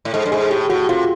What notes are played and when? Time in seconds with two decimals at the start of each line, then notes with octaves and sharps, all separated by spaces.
0.05 A2
0.14 G#2 A4
0.26 G2
0.32 G#2 G#4
0.50 A2 G4
0.70 A2 F#4
0.89 C3 F4